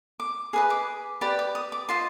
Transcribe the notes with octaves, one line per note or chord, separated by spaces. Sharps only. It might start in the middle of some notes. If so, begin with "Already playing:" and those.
D6
G#4 B4 D#5 D#6
D6
G4 B4 D5 B5
D6
D#6
D6
F4 C5 D#5 C6